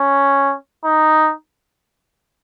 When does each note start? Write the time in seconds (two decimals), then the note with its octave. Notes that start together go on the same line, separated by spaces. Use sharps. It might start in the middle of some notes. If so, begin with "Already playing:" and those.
Already playing: C#4
0.85 D#4